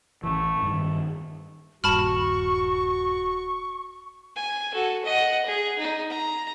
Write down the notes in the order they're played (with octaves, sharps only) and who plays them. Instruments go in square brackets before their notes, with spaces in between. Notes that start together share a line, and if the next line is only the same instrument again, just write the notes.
[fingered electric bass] A1 E3 [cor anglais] A3
[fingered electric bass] G2 D#3
[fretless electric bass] D#1 G2 [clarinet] F#4 [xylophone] A5 B5 F6 [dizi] C#6
[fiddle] G#5
F#4 A4
D#5 F#5
G#4
D#4
A#5